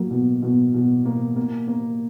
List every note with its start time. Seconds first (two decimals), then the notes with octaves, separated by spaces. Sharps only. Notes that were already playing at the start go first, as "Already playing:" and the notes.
Already playing: F#3 A#3
0.11 B2
0.42 B2
0.74 B2
1.05 A#3
1.36 A#3
1.68 A#3